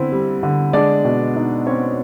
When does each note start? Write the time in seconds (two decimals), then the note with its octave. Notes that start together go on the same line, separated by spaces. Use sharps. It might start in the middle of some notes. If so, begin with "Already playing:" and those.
Already playing: D3 C4 E4
0.12 G3
0.43 D3
0.73 G#3 D4 D5
1.05 B2
1.36 D#4
1.67 C4 C#4 C#5